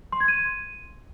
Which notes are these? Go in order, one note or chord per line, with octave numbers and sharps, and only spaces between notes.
C6
G#6
D#7